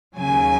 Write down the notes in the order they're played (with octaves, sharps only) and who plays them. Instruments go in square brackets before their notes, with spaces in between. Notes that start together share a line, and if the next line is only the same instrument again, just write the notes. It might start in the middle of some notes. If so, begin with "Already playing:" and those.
[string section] D#2 C#3 F#3 G#5